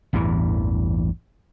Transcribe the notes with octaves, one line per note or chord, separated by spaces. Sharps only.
A1 E2 G2 E3